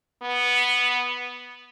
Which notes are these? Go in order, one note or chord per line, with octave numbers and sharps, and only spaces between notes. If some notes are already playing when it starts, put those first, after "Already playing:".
B3